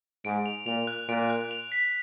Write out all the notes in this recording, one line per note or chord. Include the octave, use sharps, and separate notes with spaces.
G#2 D7
F7
A#2 F7
F#6
A#2 D7
F#6
F7
B6